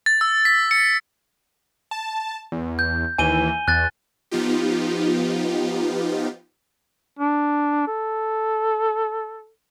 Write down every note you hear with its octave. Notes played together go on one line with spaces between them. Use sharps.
A6
E6
B6
C#7
A5
E2
G6
D#2 E3 G#5 D#7 G7
E2 F#6 A6
F3 B3 D#4 F4 G4
D4
A4